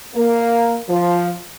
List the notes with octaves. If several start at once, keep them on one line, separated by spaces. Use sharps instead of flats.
A#3
F3